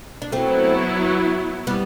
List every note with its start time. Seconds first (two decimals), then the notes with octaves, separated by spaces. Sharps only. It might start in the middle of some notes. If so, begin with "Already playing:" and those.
0.22 D4
0.32 F#3 A3 B3 C4 E4
1.67 G3 B3